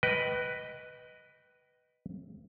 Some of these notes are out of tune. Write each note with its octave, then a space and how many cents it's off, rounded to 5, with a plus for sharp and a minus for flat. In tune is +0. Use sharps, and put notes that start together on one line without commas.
B4 +0 D#5 +0 G5 -25